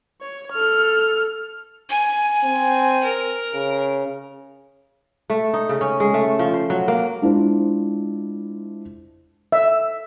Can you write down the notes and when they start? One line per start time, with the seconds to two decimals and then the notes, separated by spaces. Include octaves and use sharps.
0.21 C#5
0.52 A4 F6
1.89 G#5
2.44 C4
3.04 A#4
3.54 C#3
5.30 A3
5.54 D#4
5.69 C#3
5.81 C#4
6.00 G#3
6.14 A3
6.39 F3
6.54 C5
6.70 F#3
6.88 A#3
7.22 G#3 D4 E4 F4 C5
9.52 E5